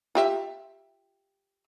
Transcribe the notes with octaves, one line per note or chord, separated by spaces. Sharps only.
F4 G4 E5